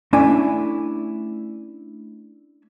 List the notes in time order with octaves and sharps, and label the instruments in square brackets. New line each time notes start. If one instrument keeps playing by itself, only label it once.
[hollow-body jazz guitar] A3 C#4 D4 E4 D5 G#5